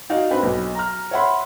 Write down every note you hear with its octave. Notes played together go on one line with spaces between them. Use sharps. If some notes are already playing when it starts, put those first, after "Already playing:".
D#4 F#4 D5 F5
C4 D4 B4
B1
A#5 F6
C#5 E5 F#5 B5 C6